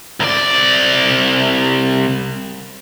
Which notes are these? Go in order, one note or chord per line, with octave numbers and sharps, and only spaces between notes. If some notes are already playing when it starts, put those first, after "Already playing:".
C2 D5